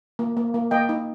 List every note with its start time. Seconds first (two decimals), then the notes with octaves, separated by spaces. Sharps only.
0.19 A#3
0.37 A#3
0.54 A#3
0.71 A#3 D#5 G5
0.89 D#4